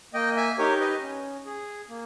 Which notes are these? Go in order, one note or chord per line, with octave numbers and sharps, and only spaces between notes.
A#3 D#5 G5
E5 G#5
D#4 G4 A#4 C#5
B4 D#5
C#4
G#4
A#3